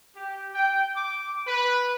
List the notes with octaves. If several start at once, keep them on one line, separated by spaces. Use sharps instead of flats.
G4
G5
D6
B4